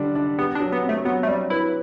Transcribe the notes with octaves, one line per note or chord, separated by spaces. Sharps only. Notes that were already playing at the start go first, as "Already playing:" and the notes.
Already playing: D3 G3 D4
D4
B3 G4
D4
F#3
B3
C4
A3
F#3 B3
A3
G3 C4
E4 B4